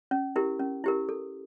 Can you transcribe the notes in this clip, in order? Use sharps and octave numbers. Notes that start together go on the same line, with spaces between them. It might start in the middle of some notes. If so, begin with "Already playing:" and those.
C#4
E4 G4 A#4
C#4
E4 G4 A#4
A4